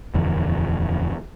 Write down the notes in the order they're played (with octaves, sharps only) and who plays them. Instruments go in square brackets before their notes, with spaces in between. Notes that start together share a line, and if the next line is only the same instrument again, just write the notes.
[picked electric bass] D#1 F2 D3 E3